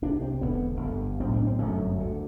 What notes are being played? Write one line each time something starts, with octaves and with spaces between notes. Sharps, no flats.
C2 C3 D4
C4
E1 E2 D3 B3
G1 G2 D3
B1 A2 C4
D4
C4
G1 F#2 D3 A3
D2 D3